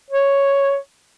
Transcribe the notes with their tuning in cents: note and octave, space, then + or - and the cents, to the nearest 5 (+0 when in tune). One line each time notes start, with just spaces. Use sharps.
C#5 +0